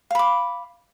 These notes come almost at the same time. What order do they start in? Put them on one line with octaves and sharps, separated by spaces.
F5 B5 D6